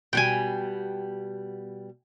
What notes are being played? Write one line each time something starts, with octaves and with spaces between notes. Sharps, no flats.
B2 G3 G5 G#5